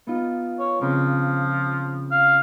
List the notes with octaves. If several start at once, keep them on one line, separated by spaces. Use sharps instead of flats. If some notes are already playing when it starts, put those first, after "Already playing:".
B3 D#4 F4
C#5
C#3 F3 C4
F5